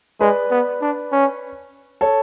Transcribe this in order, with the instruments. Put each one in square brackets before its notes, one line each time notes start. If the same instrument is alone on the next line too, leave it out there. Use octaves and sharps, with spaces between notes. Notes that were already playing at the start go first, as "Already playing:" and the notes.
[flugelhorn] G#3 [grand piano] B4 D5
[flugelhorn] B3
D4
C#4
[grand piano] A4 C#5